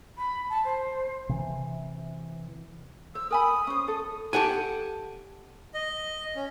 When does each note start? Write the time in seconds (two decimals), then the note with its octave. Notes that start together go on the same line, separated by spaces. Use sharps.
0.17 B5
0.49 A5
0.64 C5
1.29 C3 E3
3.15 C5 E6
3.31 A#4 G#5 B5 D#6
3.67 C#4 C5
3.88 A4
4.33 G4 A4 F#5 G#5
5.74 D#5
6.36 C#4